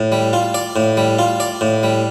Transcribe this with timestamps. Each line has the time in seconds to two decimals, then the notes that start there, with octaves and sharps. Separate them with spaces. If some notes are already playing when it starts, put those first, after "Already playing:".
Already playing: A2
0.12 G3
0.33 F4
0.54 D5
0.76 A2
0.97 G3
1.19 F4
1.40 D5
1.61 A2
1.83 G3